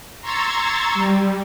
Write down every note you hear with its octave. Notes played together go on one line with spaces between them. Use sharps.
A#5 C6 C#6 E6 G#6 A6
G3